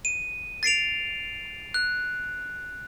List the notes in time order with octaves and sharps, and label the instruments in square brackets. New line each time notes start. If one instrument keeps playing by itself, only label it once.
[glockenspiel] D#7
A6 C7 D7 F7
F#6